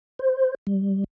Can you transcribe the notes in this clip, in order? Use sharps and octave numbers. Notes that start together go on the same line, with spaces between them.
C5
G3